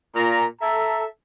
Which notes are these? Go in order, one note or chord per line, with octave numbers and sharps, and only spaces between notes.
A#2 A#5
A4 E5 A#5